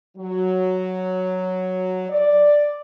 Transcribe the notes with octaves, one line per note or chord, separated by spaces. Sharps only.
F#3
D5